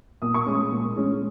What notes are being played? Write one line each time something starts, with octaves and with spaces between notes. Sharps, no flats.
A#2 D#6
C#6
G#3 C#4 D#6
A#2
G#3 C#4